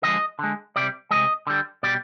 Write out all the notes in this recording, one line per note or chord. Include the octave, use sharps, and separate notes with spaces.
D3 F3 G#3 D#5
D3 G#3
C3 G3 D5
C3 F3 G#3 D#5
D3 G3
B2 G3 D5